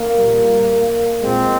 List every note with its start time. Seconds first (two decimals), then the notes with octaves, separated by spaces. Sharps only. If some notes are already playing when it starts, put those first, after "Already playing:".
Already playing: A#3
0.17 A#2 G3
1.21 A#2 G#3 C4